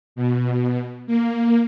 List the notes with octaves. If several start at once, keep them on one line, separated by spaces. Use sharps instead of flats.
B2
A#3